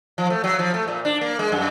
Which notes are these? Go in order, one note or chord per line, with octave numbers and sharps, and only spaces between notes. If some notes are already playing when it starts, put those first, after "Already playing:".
F3
A3
F#3
F3
A3
A#2
D4
A#3
G#3
F#2